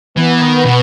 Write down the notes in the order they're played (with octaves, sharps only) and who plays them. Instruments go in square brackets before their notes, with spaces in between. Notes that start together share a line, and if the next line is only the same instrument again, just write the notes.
[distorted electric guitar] E3 [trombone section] B3
[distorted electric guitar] D#3
B2